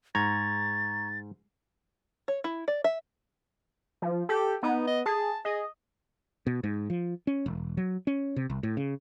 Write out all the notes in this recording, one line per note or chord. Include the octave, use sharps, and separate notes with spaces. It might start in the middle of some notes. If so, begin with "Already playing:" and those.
G#2 A#5 C#6 G#6 A6
C#5
E4
D5
E5
F3
G4 A4
B3 D#4
D#5
G#4 A5
G#4 D#5
B2
G#2
F3
C#4
E1
F#3
C#4
C3
C2
A2
C#3